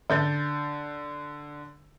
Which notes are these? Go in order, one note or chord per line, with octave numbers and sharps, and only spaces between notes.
D3 G6 A6